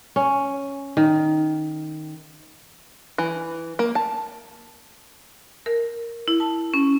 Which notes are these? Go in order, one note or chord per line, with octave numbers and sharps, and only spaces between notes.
C#4
D#3
E3
A#3
A5
A#4
E4
A5
C#4